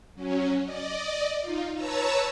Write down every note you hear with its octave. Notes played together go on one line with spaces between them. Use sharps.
F#3 C#4
D5 D#5
D#4 F4
B4 C#5 A5 A#5 E6